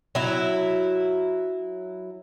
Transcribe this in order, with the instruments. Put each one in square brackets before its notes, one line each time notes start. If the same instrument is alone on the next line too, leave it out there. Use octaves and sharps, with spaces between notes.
[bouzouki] F#3 E4